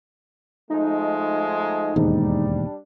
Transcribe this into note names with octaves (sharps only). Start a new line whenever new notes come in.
F3 G#3 A3 D#4
E1 D#2 G#2 G3 D4